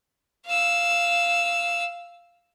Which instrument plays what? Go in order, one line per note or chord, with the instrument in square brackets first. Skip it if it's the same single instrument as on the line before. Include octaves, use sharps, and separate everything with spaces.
[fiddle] F5 E6